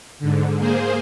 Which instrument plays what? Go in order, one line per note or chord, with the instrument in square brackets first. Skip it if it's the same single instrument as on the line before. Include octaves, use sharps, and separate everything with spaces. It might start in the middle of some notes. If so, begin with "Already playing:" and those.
[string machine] G#2 D3
A#3 G#4 C5